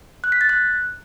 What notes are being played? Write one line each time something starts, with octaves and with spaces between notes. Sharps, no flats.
F#6
B6
A6
F#6